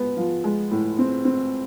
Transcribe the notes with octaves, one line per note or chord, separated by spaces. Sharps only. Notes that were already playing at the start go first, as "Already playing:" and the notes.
Already playing: G#3 B3
F3
G#3
A2
C4
C4